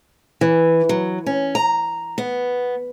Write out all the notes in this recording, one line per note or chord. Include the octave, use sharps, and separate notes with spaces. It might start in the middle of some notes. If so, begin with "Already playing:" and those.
E3
F#3
C#4
A#5
B3